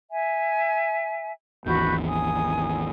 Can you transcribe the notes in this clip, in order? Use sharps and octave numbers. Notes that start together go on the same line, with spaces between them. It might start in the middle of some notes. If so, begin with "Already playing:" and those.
E5 G#5
G#1 D#2 E3 F#4 B4 G6
G#5 D#6